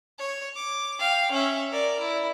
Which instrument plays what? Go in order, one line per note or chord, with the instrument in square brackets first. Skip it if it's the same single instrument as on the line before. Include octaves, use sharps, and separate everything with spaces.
[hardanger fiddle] C#5
D6
F5 G5
C#4 E5
A#4 D5
E4